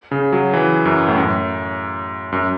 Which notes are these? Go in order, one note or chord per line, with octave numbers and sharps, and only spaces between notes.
C#3
F#3
E3
F#2
A2
F#2
F#2